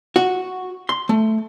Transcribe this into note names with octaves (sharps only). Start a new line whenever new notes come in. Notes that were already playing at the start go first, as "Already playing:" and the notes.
F#4
C6
A3